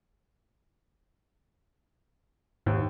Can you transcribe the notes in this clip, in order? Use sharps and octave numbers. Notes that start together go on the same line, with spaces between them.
D#2 G#2